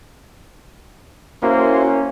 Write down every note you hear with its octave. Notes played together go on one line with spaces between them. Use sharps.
A#3 C#4 E4 F#4 C5